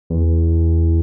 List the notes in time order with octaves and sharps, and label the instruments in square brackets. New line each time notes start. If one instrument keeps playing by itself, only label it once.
[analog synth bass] E2